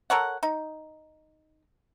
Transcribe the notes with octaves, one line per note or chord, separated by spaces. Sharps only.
A4 A#4 C#5 F#5
D#4